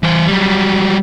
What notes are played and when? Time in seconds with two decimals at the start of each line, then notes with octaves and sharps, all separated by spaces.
0.03 E3 C5
0.27 F#3 G3